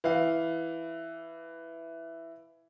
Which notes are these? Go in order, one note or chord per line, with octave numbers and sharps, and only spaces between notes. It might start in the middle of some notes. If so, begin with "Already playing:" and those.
E3 F5